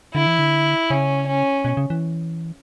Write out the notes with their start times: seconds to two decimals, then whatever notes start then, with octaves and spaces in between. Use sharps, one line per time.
0.15 D3 E4
0.27 E3
0.39 D3
0.90 C#3 C#4
1.27 C#4
1.65 B2
1.77 C#3
1.90 E3